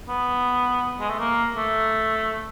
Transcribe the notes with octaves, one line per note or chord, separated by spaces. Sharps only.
B3
G#3
A3
A#3
A3